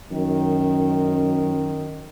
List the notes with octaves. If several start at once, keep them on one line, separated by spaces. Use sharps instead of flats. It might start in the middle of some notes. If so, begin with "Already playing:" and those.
F#2 D#3